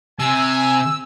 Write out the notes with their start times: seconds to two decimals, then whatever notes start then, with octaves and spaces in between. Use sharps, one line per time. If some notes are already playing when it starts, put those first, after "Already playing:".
0.19 C3 G#5 E6